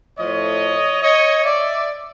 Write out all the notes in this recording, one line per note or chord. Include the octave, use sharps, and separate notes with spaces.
A2 F3 A3 C#5 D#5
C#5 D#5
D5 E5